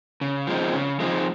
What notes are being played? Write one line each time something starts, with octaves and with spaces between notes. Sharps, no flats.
C#3
F3 G#3 C4 D#4
C#3
F3 G#3 C4 D#4